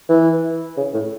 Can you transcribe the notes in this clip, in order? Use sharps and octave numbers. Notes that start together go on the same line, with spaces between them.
E3
C#3
A2